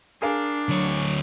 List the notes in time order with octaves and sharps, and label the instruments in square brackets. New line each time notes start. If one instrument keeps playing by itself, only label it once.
[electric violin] D4 [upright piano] G#4 A#4 F5
[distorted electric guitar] D2 C#5 [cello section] F#3